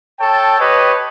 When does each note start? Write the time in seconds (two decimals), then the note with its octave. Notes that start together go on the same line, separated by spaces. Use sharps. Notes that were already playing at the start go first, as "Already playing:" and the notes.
0.20 A4 C#5 G5 A5
0.59 G4 B4 C#5 D#5